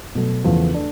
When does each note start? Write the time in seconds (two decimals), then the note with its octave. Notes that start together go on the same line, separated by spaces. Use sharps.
0.15 B2 F#3 A3
0.44 E2 C#3 F3 A3
0.74 A3 D4